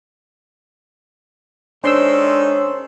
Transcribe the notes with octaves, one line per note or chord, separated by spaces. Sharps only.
D#3 G#3 C#4 D4 A4 C5 C6 E6